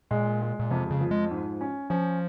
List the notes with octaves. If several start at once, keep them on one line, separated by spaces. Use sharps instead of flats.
A#2 G#3
G#3
A#2
F2 C3
C#3
F3
G#3
G#2
C#4
F3 C#4